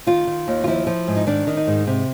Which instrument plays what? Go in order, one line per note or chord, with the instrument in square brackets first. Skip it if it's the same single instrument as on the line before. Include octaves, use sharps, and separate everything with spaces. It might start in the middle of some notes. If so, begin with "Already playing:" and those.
[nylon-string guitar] D#3 F4
D#3
D#2
F4
F3 E4
F3
G#2
D#4
D#3 D4
D#3
D#4
G#2
C3